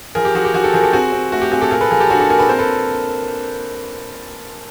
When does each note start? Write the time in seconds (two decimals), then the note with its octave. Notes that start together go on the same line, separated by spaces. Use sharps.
0.15 F3 G#4 A#4
0.25 G4
0.35 F3 F#4 G#4
0.45 G4
0.54 F3 F#4 G#4
0.64 G4 A4
0.74 F3 G#4 A#4
0.83 G4 A4
0.93 C4 F#4 G#4
1.12 C4
1.32 A3 F#4
1.42 G4
1.52 C4 F#4 G#4
1.61 G4 A4
1.71 A#2 G#4 A#4
1.81 A4 B4
1.90 F3 G#4 A#4
2.00 G4 A4
2.10 D4 F#4 G#4
2.20 G4 A4
2.29 A#2 G#4 A#4
2.39 A4 B4
2.49 C4 A#4 C5
2.59 A4 B4